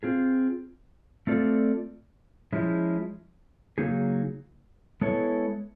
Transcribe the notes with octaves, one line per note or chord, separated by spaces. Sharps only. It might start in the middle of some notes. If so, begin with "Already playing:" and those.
C4 F4 G#4
A3 C4 F4 A4 D5
F3 G#3 C#4 E4
C#3 F#3 A#3 D#4 G#4
G#3 B3 E4 A4 C#5